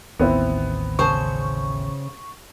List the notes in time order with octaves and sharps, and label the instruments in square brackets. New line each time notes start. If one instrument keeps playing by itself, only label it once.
[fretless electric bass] A1 D#2 [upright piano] B3 C4 E4
[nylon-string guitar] C#3 C5 A5 [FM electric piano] C#6